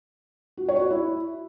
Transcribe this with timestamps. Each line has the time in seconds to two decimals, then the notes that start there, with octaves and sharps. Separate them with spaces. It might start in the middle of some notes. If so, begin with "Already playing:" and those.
0.57 F#4
0.68 C#5
0.80 F#4
0.91 E4